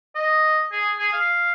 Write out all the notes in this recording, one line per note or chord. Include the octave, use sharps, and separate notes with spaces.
D#5
G#4
G#4
F5